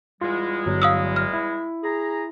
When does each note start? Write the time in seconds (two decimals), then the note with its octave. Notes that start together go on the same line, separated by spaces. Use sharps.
0.21 E2 G3 G#3 F4
0.66 G1 F#3
0.82 F5 D#6 E6
1.16 F6
1.33 E4
1.83 G#4 A#5